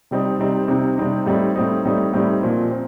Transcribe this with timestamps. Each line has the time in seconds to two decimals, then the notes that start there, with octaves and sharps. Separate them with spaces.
0.11 C3 G3 C4 D#4
0.39 C3 G3 C4 D#4
0.68 C3 G3 C4 D#4
0.98 C3 G3 C4 D#4
1.26 A2 G3 C4 D#4
1.56 A2 G3 C4 D#4
1.85 A2 G3 C4 D#4
2.13 A2 G3 C4 D#4
2.43 A#2 F3 C4
2.71 C4